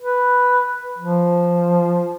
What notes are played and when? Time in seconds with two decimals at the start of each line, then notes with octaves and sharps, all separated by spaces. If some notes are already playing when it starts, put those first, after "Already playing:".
0.01 B4
0.98 F3